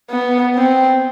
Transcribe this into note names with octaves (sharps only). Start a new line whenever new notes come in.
B3
C4